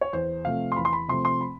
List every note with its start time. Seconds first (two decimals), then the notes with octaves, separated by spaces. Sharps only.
0.01 C#5
0.13 E2 C5
0.45 C3 F3 A3 C4 F5
0.72 C6
0.76 E2 B5
0.85 C6
0.93 B5
1.08 C3 F3 A3 C4 C6
1.25 C6
1.41 B5